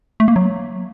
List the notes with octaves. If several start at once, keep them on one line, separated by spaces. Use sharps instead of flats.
A3
A#3
F#3